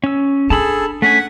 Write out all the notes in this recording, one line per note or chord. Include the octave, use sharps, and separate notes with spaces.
C#4 E6
D4 G#4 A4 A5 B5 E6
A3 C#4 F#5 G#5 B6